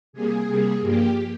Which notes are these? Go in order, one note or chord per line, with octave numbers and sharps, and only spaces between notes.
C3 G3 A#3 G#4
C3 G3 A#3
G2 F3 A#3 G4